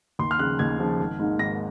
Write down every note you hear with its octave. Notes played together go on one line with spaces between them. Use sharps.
D#2 C6
F6
C#3 F3 F#6
D#2 G#6
C#3 F3
G#1
G#2 D#3 A#3
G#1 A#6